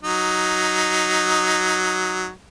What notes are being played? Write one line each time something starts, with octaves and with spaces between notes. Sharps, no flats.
F#3 D#4